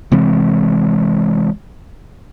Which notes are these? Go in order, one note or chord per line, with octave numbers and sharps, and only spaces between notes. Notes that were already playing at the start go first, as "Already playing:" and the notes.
C3 E3 G#3 C4